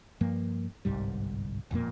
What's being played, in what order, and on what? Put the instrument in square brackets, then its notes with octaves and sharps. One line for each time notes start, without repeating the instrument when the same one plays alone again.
[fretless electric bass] G2 F3 A#3
G1 C2 G#2 G3
E1 F2 A#2 A#3